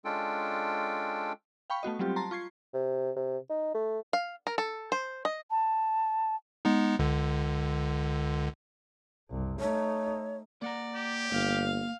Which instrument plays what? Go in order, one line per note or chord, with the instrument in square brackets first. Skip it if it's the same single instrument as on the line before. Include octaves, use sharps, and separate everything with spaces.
[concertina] G#3 C#4 D4 F4 A4 G5
[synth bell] F5 G5 B5 C#6
A3 B3 F#4 D#5
F#3 G3 C4 F4 G4
A5 A#5 C6
F4 C#6 G#6 C7
[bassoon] C3
C3
D#4
A3
[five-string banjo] F5
A#4
A4
C5
D#5
[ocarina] A5
[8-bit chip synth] G#3 B3 D#4
C#2 D3
[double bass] F#1 C2
[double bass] A3 D#4 [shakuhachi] C#5
[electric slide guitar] A#3 F#5 A#5 [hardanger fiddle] D5
[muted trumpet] G4
[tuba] G1 [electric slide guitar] A#3 [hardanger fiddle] F5